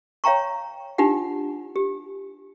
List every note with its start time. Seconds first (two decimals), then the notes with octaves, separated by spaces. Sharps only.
0.24 C#5 F5 G5 A#5 C#6
0.98 D4 D#4 F4 G4 F#5
1.76 G4